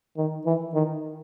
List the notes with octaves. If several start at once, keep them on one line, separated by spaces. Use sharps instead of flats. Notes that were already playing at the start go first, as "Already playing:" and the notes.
D#3
E3
D#3